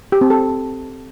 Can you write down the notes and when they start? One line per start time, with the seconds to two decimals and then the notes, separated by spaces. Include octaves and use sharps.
0.12 G4
0.21 C4
0.30 A4